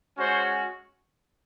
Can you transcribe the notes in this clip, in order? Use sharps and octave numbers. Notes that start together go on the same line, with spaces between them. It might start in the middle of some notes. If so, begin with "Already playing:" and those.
G#3 C#4 F#4 C5